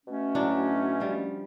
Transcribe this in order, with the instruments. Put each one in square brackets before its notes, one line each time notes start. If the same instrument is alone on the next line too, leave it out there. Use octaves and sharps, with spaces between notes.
[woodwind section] B2 A3 C#4
[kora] A2 F#3 D4
F3 G3